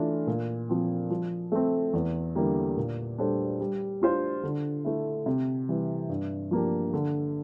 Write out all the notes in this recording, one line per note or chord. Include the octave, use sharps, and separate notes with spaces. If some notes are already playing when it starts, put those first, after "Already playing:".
Already playing: E3 A3 D4 F4
A#2
F3 C4
F3
A3 C4
E2
D3 G3 A#3 E4
A#2
G3 D4 A4 C5
G3
D4 F4 C5
D3
A3 E4
C3
E3 G3
G2
F3 A#3 D4 G4
D3